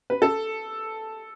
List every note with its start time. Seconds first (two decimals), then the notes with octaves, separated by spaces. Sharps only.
0.10 B4
0.22 A4